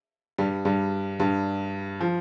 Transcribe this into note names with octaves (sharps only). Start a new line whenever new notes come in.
G2 G3
G2 G3
G2 G3
F3